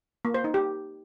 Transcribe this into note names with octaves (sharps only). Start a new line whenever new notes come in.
A#3
C5
D#4
G4